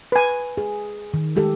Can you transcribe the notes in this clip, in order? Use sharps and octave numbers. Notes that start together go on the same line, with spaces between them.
B4 G#5
G#4
D#3
G#3 G4 A4